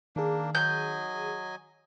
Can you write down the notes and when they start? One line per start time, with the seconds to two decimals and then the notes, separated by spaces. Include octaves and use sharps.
0.16 D#3 A#3 D4 G#4
0.55 F#3 D#5 G#5 G6